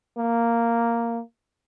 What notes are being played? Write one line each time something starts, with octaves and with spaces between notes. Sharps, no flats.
A#3